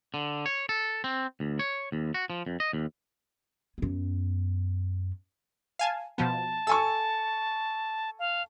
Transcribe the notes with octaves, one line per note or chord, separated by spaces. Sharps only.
D3
C#5
A4
C4
D2
C#5
D#2
F#4
F3
F2
D#5
D#2
F#2 B3
F5 G#5 A5
B2 F3 B3 A5
A4 G#5 C#6 E6
F5